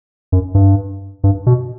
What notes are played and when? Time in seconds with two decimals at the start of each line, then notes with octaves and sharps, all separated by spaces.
0.32 F#2
0.55 G2
1.24 G2
1.46 B2